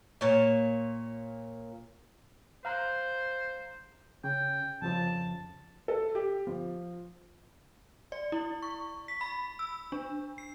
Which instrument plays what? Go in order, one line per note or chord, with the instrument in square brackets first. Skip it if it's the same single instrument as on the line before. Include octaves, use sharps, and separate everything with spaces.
[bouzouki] A#2 C#5
[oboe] C5 [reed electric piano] F5 A#5 F#6
[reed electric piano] C#3 [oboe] G5
[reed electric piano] F2 C#3 F3 [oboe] A5
[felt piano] A4
G4
F3
[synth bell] D5
E4
C#6
B6
B5
E6
D4
C7